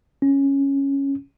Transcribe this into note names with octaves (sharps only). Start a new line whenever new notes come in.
C#4